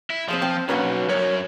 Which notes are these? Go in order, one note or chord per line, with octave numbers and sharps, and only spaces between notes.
E4
F3 C4 G#4 D#5
C4 A5
B1 A#3 C#4 D4 F#4 B4
F#2 C#5